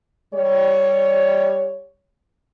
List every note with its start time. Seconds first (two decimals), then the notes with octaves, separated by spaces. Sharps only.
0.33 G3 C#5